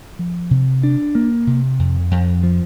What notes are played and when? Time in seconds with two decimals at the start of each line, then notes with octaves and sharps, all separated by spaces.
0.19 F3
0.51 C3
0.83 D4
1.15 A#3
1.47 C3
1.79 F2
2.11 F2
2.43 F3